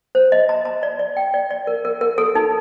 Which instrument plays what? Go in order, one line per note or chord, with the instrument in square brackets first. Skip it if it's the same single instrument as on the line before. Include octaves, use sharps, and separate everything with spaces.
[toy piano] C5
D#5
A#5
A#5
D5
D5
G5
D5
D5
A#4
A#4
A#4
A4
D#4